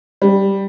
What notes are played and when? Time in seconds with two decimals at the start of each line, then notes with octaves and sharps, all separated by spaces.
0.22 G3